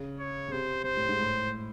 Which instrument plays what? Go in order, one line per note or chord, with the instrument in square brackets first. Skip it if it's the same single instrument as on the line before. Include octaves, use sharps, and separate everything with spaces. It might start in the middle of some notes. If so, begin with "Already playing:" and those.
Already playing: [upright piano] C#3
[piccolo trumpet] C#5
[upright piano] C#3
[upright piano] C3 [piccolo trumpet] C5
[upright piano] C3 [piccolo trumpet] C5
[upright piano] A2
G#2
A2